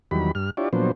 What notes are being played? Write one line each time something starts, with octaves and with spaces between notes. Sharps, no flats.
E2 D#3 F#3 G3 B5
G2 F6
D4 E4 F4 G4 C#5 D5
A#2 F3 F#3 B3 D4 C5